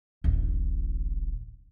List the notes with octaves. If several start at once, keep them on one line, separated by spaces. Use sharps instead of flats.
D1 A1